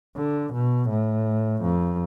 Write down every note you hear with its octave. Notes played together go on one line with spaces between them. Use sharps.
D3
B2
A2
F2